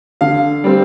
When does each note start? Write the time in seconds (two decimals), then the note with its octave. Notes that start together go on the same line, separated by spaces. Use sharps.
0.21 D3 F5
0.64 G3 C4